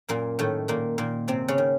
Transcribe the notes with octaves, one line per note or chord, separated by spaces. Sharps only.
F#2 A#2 A#3
A2 D#3 A3
A#2 D#3 A#3
A#2 D#3 A#3
G#2 C3 C4
C#3 C#4
D#3